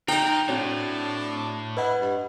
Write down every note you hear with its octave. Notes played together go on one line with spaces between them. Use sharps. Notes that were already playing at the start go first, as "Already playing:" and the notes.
D#4 A#4 C5 G5 A#5
A2 C4 D4 F#4 C#5
E4 B4 D#5 F#5
G2